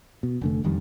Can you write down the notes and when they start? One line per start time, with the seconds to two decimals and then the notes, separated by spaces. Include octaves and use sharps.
0.23 B2
0.41 F1 D3 A3
0.64 E1 F2 D#3 G3